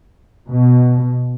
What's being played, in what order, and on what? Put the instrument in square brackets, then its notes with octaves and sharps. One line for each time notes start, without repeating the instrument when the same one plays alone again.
[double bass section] B2